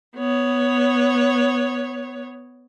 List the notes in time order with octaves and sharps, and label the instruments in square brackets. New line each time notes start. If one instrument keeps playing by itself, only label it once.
[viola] B3 C#5